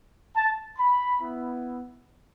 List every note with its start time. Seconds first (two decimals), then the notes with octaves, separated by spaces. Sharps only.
0.36 A5
0.79 B5
1.22 B3 E4